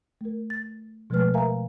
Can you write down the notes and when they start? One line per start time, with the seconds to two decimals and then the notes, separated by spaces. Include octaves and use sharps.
0.21 A3 A#4
0.50 A6
1.10 B2 F3 G#3 A3 B4 F6
1.34 A#4 E5 F5 G#5 A#5